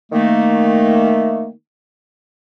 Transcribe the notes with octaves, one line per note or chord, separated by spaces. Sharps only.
D#3 A3 A#3